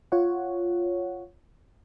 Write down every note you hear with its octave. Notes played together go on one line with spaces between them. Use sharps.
F4 C#5 F#5